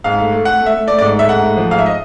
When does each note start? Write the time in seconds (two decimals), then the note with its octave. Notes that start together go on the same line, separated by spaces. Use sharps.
0.04 G#2 F5
0.19 A3
0.32 A3
0.45 A3 F#5
0.60 A3
0.66 E5
0.74 A3
0.87 A3 D5
0.99 G#2 D5
1.16 A3 E5
1.28 G#2 F#5
1.43 A3
1.57 F3
1.70 G#2 F5
1.79 E5
1.86 D#5